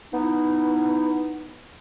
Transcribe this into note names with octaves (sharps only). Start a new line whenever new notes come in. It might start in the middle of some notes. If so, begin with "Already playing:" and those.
B3 D#4 E4